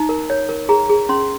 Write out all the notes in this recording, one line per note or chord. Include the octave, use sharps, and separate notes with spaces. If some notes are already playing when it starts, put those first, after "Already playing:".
Already playing: D#4 A#5
A#4
C#5
A#4
G#4 A#5
G#4
C#4 C6